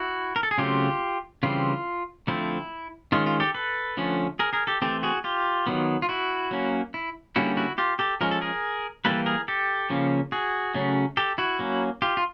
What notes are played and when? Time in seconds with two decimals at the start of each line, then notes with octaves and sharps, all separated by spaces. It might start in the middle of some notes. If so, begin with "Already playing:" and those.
Already playing: E4 F#4
0.36 A#4
0.43 A4
0.51 G#4
0.58 C#3 F#3 A3 C4 F4 G4
1.43 C#3 E3 G3 C4 F4
2.27 D3 F3 A3 C4 E4
3.12 D#3 G#3 C#4 F4
3.26 F4
3.40 G4 A4
3.54 A4 B4
3.97 D3 F3 A3 C#4
4.39 G#4 A#4
4.53 G#4 A#4
4.67 G4 A4
4.82 E3 A3 C4 G4 A4
5.03 F#4 G#4
5.24 F4 G4
5.67 D#3 F#3 B3
6.02 F4
6.09 E4 F#4
6.51 F#3 A#3 C#4
6.94 E4
7.36 D3 G3 A#3 C#4 E4 F#4
7.57 E4 F#4
7.78 F4 G4
7.99 G4 A4
8.21 F3 G#3 C#4 A#4
8.31 A4
8.41 G#4 A#4
9.05 E3 G3 A#3 A4 B4
9.26 G#4 A#4
9.48 G4 A4
9.90 C#3 F3 A#3 C#4
10.32 F#4 G#4
10.74 C#3 F#3 A3 C#4
11.17 G4 A4
11.38 E4 F#4
11.59 F#3 A#3 C#4
12.02 F4 G4
12.17 F4